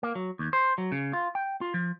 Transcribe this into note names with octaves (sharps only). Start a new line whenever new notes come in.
A#3
F#3
D#2
C5
F#3
C#3
F4
G5
F4
F3